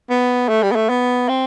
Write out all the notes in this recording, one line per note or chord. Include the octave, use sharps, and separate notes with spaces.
B3
A3
G3
B3
A3
B3
C4